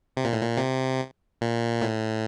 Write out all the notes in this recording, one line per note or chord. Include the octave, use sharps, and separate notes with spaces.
C3
A#2
A2
A#2
C3
A#2
A2